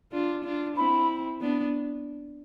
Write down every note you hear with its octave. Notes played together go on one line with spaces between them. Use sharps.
D4 F4
D4 F4
C4 E4 B5
B3 D4